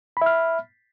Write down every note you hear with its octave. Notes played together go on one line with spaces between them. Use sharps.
E5 B5 F6